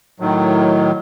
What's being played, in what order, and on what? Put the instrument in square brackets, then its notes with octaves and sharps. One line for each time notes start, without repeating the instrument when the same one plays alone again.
[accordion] A2 D#3 F#3